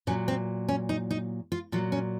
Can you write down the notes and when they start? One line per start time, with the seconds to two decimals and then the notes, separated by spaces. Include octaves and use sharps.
0.07 A#2 F#3 C#4
0.28 C4
0.68 C#4
0.89 D#4
1.11 D#4
1.52 F4
1.72 A#2 F#3 F4
1.92 C#4